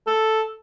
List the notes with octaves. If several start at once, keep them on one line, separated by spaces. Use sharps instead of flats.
A4